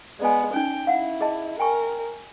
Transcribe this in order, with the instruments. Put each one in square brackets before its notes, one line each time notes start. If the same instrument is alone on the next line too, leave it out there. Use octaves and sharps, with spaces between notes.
[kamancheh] G#3 B3 [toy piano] D5 G#5
[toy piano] C#4 D#4 [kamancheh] G5
[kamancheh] E4 [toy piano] F5 F#5
[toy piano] G#4 D#5 A5
[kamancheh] A#4 [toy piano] G5 G#5 C#6